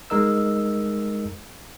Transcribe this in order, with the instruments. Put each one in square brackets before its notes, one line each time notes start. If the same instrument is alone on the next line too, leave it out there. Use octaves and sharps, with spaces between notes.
[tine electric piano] G#3 D#4 A#4 D#5 E6